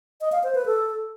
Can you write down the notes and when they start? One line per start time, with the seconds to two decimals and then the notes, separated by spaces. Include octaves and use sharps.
0.21 D#5
0.32 F5
0.43 C5
0.55 B4
0.66 A4